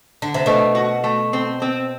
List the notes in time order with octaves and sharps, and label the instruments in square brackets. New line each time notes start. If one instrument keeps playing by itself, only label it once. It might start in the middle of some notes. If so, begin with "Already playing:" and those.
[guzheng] D3
C3
[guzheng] B2 [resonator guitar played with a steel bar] A3
[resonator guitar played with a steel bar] F#4
A3
C4
C4